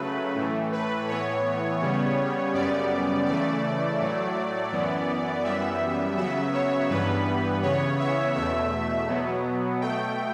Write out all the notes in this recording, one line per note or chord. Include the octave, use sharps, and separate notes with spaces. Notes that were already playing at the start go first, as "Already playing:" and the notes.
Already playing: C#3 F#3 A3 B4
A2 E3 A3
B4
A2 E3 B3 C#5
C#3 G3 B3
F#2 C#3 G3 B3 D5
C#3 E3 A3 D5
A2 F#3 A3
F#2 E3 B3
F#2 E3 G3 B3 E5
C#3 F#3 B3 E5
C#5
G2 E3 G3 B3 B4
C#3 E3 B3 C#5
E5
E2 B2 A3 E5
B2 F#3 B3
B2 A3 G5